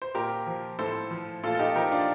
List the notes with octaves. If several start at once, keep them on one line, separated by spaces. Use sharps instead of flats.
C5
A#2 G4 A#4
F3
A2 A4 C5
F3
A#2 F4 A4
A4
D#4 G4
F3 G4 A#4
D4 F4